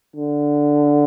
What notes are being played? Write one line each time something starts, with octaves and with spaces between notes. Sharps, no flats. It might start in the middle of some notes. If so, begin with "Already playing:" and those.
D3